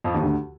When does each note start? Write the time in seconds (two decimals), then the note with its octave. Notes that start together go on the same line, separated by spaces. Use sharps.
0.04 F2 F3
0.14 D#2 D#3
0.23 D2 D3